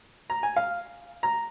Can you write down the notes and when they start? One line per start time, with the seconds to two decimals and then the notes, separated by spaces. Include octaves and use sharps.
0.30 A#5
0.43 G#5
0.56 F5
1.23 A#5